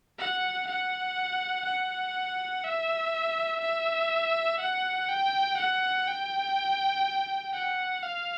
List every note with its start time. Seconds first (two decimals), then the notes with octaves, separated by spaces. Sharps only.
0.19 F#5
0.68 F#5
1.65 F#5
2.64 E5
3.61 E5
4.60 F#5
5.09 G5
5.58 F#5
6.07 G5
7.53 F#5
8.03 F5